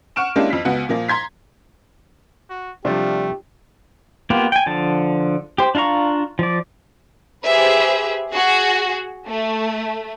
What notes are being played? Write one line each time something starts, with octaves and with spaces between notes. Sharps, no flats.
F#5 C#6 F6 D7 E7
G#3 A#3 C#4 D4 E4 G4
F2 B6
C#2 B3 F#4 F#5
A#2 F3 A#3
A#5 C6 G#6 B6
F#4
C3 F3 G3 A3 D4 F4 G4
A#3 B3 F4 G4
G5 G#5
D3 F3 A5
G4 C5
D4 F4 F5 A#5 C#6
F3 D5
G4 G#4 B4 C5 E5
F#4 G#4
A3